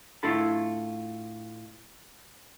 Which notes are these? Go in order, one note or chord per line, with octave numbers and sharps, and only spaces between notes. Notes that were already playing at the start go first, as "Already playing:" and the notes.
A2 D4 E4 F4 A4 B5